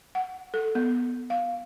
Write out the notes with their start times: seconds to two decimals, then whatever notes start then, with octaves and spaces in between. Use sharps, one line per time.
0.15 F#5
0.54 A4
0.75 B3
1.30 F5